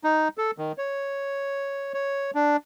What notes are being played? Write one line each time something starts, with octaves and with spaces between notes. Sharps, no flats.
D#4
A4
D#3
C#5
C#5
D4